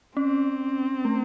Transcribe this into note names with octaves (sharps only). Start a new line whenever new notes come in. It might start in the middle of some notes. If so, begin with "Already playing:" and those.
C4 C#4
A3